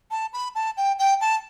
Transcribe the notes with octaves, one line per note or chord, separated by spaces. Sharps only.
A5
B5
A5
G5
G5
A5